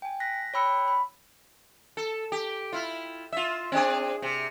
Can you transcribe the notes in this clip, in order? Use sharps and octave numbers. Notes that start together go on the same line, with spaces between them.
G5 G#5
F#6 A#6 B6
C#5 G5 B5 E6 F#6 C#7
B5
A4
G4
E4 F4
F4 E5
C4 D4 G#4
C3